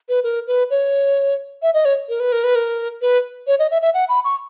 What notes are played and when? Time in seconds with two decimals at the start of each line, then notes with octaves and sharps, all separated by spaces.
0.09 B4
0.24 A#4
0.47 B4
0.70 C#5
1.62 E5
1.74 D#5
1.85 C#5
2.09 A#4
2.20 B4
2.32 A#4
2.44 B4
2.55 A#4
3.02 B4
3.47 C#5
3.59 D#5
3.71 E5
3.82 E5
3.94 F#5
4.09 B5
4.24 C#6